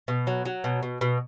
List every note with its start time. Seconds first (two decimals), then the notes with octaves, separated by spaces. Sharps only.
0.08 B2
0.27 F#3
0.45 F#3
0.64 B2
0.83 B2
1.01 B2